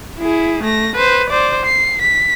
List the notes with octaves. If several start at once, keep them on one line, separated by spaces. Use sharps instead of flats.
E4 G#4
A3 A#6
B4 C5
C5 D5
C7
B6